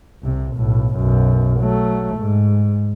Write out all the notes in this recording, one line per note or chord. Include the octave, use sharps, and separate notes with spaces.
C2 C3
B1 A2
B1 F#2
F#3 A3
G#2